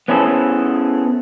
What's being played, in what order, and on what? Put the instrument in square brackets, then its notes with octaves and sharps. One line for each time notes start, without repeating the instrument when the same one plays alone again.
[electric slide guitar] B3 C#4 E4 G#4 A4 C5